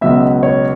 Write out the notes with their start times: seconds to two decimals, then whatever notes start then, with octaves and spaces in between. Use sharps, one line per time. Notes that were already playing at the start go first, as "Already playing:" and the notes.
0.01 C#2 B2 F#3 B3 E5
0.43 C#5